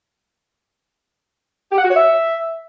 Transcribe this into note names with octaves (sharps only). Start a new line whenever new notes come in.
G4
F#5
F#4
C#5
E5